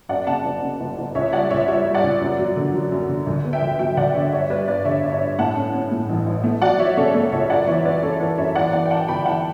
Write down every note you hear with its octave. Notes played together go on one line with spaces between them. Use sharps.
F#2 D5 F#5
C#3 F#5 A5
F#1
C#3
F#1
F#1
C#2 C#5 E5
G3 D5 F#5
C#2 C#5 E5
G3 C#5 E5
G3
D5 F#5
C#2
F#2
F#3
D3
F#3
F#2
D3
D2
B3
E5 G5
D2
F#3 E5 G5
D2 D5 F#5
D3 C#5 E5
G2 C#5 E5
G3 B4 D5
G2 B4 D5
D3 C#5 E5
G2
C#5 E5
G2
A2 F#5 A5
C#4
C#4
A2
A1
A1
A3
F#3 D5 F#5
F#3 C#5 E5
C#3 A4 C#5
A3 A4 C#5
C#2 C#5 E5
F#2 D5 F#5
E3 C#5 E5
F#2 B4 D5
C#3 A4 C#5
E3 B4
F#2 C#5 E5
E3 D5 F#5
E3 D5 F#5
G5
E3 F#5 A5
G1 G5 B5
E3 F#5 A5